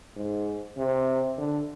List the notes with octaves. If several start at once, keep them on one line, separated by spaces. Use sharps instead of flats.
G#2
C3
D3